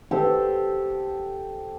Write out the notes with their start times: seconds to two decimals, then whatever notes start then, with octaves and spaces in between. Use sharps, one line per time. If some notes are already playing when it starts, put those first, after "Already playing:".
0.11 G4 A4 C5